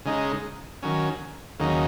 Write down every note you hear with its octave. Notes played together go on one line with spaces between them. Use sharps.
C#3 G#3 D#4
D#3 F#3 C#4
D#2 C#3 F#3 D#4